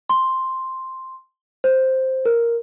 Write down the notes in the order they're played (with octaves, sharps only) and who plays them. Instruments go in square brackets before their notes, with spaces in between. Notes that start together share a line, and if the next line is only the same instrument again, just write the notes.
[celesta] C6
C5
A#4